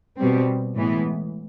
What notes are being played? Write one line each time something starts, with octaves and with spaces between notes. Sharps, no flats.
B2 G3 C4
A2 E3 G#3 B3